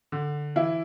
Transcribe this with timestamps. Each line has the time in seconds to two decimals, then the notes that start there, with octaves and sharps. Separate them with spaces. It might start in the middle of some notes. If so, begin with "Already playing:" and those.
0.12 D3
0.56 E3 E4